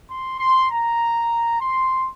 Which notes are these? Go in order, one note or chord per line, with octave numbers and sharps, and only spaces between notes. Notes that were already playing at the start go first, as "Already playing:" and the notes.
C6
C6
A#5
C6